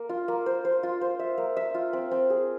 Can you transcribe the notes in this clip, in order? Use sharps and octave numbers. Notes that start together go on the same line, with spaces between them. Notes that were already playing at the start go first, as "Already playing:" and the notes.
Already playing: A#3
F4
A#3
C5
C5
F4
C5
E5
A#3
E5
F4
C4
C4
G#4